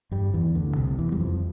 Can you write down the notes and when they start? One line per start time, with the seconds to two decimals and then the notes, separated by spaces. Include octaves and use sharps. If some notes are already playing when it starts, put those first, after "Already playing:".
0.11 G2 G3
0.34 E2 E3
0.55 D2 D3
0.76 C2 C3
0.99 E2 E3
1.12 G3
1.20 F2 F3